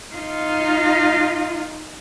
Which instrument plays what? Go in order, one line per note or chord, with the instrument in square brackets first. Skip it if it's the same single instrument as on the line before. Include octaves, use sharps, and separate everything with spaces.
[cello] D#4 F4